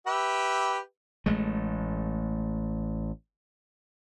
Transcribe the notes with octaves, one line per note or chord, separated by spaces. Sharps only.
G4 B4 E5
A1 G#3 A3